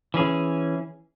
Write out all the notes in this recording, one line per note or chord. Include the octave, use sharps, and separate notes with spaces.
E3 C#4 G#4